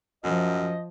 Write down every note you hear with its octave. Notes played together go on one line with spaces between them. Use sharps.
F#2 F3 D#5